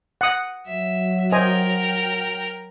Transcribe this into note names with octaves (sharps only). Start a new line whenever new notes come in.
F#5 D#6
F#3 E5
A#4 C5 D#5 G5 G#5